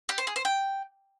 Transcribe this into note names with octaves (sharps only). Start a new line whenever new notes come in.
G4
C5
G#4
C5
G5